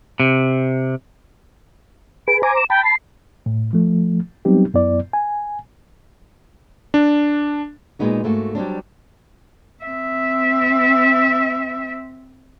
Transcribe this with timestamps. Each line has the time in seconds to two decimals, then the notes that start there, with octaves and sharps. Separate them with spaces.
0.20 C3
2.28 G#4 B4 D7
2.43 C5 G#5 A#5 D6
2.56 E7
2.70 G5 A5 B5
2.85 C7
3.46 A2
3.73 F3 A3
4.45 F#3 G3 B3 C4 D#4 G4
4.74 F#2 B3 E4 D5
5.13 G#5
6.94 D4
7.99 A#2 G3 G#3 B3 D#4 F#4
8.24 G#2 A3 A#3 F#4
8.55 F#3 G3 C4 D4
9.84 C4 E5